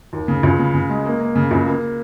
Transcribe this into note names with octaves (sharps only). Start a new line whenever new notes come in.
D#2
C#3
C#2
C#3
C#3
G#3
A#3
A#3
C#3
C#2
A#3